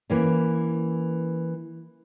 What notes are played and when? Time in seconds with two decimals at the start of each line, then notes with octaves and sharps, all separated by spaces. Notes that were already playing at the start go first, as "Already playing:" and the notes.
0.10 E3 A#3 C#4